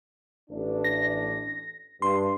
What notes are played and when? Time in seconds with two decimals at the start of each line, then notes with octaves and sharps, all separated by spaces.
0.50 A1 D4
0.84 A#6
2.02 G2 C6